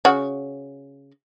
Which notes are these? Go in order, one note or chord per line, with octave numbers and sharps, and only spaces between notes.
C#3 F#4